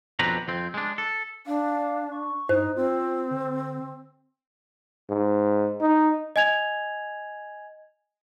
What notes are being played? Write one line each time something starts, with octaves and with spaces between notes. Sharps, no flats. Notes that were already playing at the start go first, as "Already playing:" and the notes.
F2 B2 C4 D4 B4 A#5
F2 C4
G#3 D4
A4
D4 F5
C#6
G2 D#4 C5
C4 F4
D3
G#2
D#4
D#5 G#5 G#6 F7